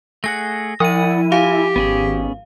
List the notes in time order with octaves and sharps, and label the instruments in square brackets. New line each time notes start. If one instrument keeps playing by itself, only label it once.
[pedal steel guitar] A3 G#4 F#5 [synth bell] A#6
[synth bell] F3 D#7 [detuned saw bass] E4 [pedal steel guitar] D5 F#5 D#6
[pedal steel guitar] F4 G#5 [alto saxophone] G4 [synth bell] F5
[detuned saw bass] G#1 [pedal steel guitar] B3 C#4 G#4